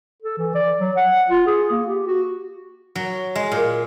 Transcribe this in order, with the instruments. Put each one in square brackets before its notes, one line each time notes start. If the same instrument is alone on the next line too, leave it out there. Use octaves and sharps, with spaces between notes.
[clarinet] A4
E3
D5
F#3
F#5
F4
G#4
A#3
G4
F#4
[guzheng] F#3
G#3
A#2